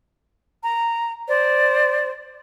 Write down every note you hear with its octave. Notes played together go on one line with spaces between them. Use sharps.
A#5
C5 D5